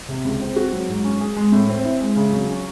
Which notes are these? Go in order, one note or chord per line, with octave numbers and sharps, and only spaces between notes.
C3
C#2
C4
F#4
F#3
G#2
C#4
G#4
G#3
A2
C4
E4
G#3
C#3
F#3
C#4